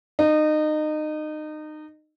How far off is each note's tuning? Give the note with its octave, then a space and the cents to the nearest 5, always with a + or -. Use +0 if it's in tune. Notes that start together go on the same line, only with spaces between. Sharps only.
D#4 -25